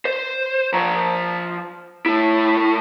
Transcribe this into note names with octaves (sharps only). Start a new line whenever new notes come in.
C5
F3 A#5
A2 E4